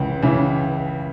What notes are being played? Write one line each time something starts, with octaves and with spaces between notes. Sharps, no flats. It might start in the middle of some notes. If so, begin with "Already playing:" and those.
Already playing: C#2 C#3 E3
C#3 E3